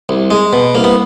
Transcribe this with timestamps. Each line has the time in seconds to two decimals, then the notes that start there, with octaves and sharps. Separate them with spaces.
0.09 C2
0.31 G#3
0.53 B2
0.75 C2 A#3
0.84 B3